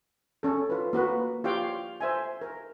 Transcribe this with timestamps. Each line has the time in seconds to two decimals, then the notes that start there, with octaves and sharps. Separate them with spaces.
0.43 C#4 A4
0.70 F4 B4
0.93 A#3 F#4 B4
1.44 F4 G4 C#5 F5 G5
2.01 C5 E5 G#5
2.41 A#4